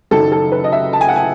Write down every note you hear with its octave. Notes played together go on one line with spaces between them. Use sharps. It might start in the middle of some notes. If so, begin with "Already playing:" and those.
F#1 F#2 D#3 F#3 A4
A4
B4
D#5
E5
A5
G#5
F#5
G#5